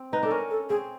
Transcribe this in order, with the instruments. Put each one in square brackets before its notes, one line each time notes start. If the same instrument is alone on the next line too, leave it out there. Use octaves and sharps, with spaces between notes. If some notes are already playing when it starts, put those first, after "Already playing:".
Already playing: [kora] C4
[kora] D#4 [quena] B4
[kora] D4 [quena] A4
[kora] C#4 [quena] A#4
[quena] A4
[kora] C4 [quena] G#4